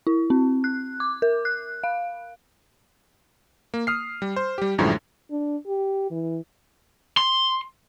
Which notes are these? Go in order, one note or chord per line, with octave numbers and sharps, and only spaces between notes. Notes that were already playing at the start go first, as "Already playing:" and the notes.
E4
C4
F#6
D6
A#4
F#6
F5
A#3
D#6 F6 C7
G3
C5
G3 G4
A#1 F#2 A2 D3 F3 G#3
D4
G4
E3
C6